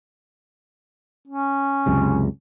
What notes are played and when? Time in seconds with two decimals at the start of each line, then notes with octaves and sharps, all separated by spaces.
1.27 C#4
1.86 C#2 F#2 C3